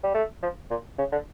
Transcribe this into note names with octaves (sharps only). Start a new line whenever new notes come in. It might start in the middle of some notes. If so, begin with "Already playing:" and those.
G3
A3
F3
A#2
C#3
D3